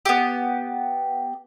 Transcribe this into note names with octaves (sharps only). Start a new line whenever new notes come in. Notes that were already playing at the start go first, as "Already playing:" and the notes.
B3 G4